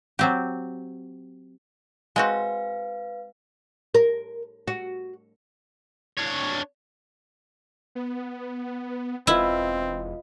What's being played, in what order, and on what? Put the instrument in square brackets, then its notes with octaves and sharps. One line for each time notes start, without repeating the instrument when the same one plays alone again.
[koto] F#3 C4 G4
[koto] G#3 C4 F#4 [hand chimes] B4 F5
[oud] A#4
F#4
[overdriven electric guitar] D4 C#5
[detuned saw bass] B3
[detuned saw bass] E1 [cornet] C4 [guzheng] E4 [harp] F4 B4 D#5